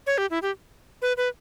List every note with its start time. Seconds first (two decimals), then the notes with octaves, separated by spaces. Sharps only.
0.07 C#5
0.18 G4
0.30 E4
0.42 G4
1.02 B4
1.17 B4